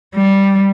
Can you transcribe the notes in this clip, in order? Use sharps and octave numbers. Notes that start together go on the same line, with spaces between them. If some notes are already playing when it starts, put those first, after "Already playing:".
G3